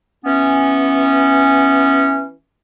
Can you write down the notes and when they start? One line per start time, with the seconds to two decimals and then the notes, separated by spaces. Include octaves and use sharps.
0.24 E3 B3 C#4